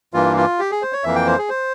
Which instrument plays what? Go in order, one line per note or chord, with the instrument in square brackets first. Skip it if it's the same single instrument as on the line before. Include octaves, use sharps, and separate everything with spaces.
[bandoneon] G2 E3 A#3 F4
F4
G4
G#4
C5
C#5
F2 E3 A#3 E5
G5
C5
G#4
C5